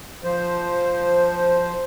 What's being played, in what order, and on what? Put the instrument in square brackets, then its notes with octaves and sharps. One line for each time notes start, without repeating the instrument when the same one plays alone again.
[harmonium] F3 C5